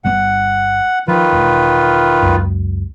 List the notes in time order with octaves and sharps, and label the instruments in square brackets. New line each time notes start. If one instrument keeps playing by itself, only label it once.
[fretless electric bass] G1 G3 B3 [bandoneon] F#5
[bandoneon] D#3 F4 B4 [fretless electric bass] F3
[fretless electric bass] E1
C#2 F#2